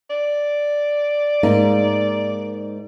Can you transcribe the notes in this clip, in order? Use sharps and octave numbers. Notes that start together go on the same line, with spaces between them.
D5
G#2 A#3 D#4